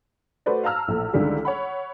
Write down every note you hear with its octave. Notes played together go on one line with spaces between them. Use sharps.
A3 F#4 B4 C5 D5
F5 A5 A#5 E6 F6
A#1 A2
C#2 D3 D#3 G3 G#3
C#5 F#5 B5